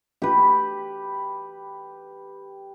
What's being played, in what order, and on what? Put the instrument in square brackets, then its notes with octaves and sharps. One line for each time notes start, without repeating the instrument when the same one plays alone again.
[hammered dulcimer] G4 B4